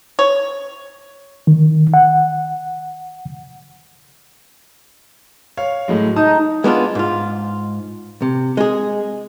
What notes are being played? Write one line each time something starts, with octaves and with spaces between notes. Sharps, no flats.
C#5
D#3
F#5
C#5 F5
A2 F#3 G#3
D#4 A5 D#6
G#3 B3 D4 F4
G#2 F4
C3
G#3 G#4